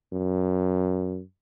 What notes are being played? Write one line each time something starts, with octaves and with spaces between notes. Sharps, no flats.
F#2